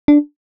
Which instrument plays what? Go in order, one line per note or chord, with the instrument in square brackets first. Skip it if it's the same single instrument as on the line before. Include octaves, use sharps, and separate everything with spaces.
[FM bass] D4